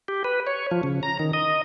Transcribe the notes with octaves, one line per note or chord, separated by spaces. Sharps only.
G4
B4
C#5
F3
C#3
A#5
D#3
D#5